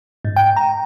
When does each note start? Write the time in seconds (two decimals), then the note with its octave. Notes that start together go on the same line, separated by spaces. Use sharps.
0.25 G#2
0.36 G5
0.56 A#5